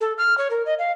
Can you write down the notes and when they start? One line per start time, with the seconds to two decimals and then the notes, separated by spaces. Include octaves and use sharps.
0.01 A4
0.18 F6
0.38 C#5
0.50 A#4
0.66 D#5
0.79 F5